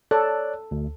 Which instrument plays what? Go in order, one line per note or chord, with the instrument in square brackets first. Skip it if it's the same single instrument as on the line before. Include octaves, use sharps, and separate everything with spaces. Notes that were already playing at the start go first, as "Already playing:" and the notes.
[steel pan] A4 [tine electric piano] C#5 D5 F#6
[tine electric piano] D2